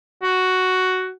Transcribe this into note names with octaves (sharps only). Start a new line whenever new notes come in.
F#4